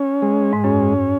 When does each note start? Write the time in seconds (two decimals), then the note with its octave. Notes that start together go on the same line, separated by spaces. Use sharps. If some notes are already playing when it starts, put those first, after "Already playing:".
Already playing: C#4
0.22 G#3
0.53 G#2
0.64 F#2 C#4